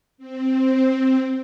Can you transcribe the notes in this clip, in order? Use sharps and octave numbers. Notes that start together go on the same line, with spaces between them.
C4